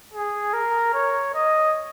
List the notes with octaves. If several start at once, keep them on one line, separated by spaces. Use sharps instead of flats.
G#4
A#4
C#5
D#5